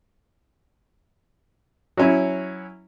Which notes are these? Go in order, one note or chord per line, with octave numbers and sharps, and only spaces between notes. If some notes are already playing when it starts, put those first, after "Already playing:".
F#3 C#4 E4